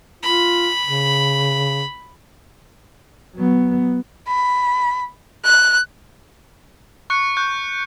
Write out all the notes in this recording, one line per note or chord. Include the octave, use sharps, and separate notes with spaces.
F4 B5
C#3
F#3 B3
B5
F#6
C#6 F#6 C#7
C#6 F#6 G6